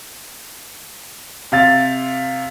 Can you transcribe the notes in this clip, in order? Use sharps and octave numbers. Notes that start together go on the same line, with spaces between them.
C3 F5 A6